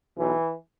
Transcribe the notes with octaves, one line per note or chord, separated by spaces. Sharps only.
B1 B2 E3